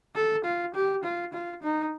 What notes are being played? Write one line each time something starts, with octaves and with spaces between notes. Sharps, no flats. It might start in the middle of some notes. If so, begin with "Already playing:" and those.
A4
F4
G4
F4
F4
D#4